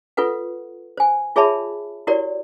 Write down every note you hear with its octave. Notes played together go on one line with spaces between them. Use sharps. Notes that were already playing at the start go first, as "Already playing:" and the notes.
F4 A4 B4 F#5
C5 G#5
F4 G#4 C#5 E5 A5 B5
E4 F#4 G4 A#4 C#5 D5